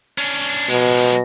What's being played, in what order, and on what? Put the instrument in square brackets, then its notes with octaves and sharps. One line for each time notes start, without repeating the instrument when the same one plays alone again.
[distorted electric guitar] C#4 D4
[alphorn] B2 [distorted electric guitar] F3 G#3